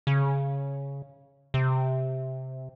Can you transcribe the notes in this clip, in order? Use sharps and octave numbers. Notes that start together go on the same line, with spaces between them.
C#3
C3